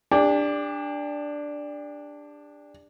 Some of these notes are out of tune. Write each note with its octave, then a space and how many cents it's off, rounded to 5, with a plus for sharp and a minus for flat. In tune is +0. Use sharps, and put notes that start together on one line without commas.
D4 +0 G4 +40